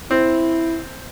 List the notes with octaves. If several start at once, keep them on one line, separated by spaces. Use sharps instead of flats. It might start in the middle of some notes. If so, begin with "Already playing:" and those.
C4 E4